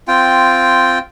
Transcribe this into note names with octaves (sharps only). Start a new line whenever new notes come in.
C4 F4 G5